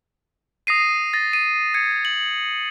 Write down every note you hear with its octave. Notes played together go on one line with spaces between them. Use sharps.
D#6 A#6 C7 D#7
A6 A#6
D#7
G#6 C#7
F#7